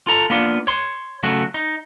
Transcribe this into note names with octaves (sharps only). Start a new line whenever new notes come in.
F4 A4 A#5
A#3 B3 D4 F4
C#5 C6
C#3 F#3 A3 F#4
D#4